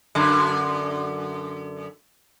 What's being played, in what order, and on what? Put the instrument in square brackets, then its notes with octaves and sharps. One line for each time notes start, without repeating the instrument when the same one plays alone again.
[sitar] F#2 D3